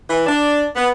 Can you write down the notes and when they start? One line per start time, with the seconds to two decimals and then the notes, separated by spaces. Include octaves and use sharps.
0.10 E3
0.27 D4
0.76 B3